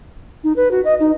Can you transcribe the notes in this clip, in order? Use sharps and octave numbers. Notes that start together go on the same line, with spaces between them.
D#4
B4
F#4
D#5
D#4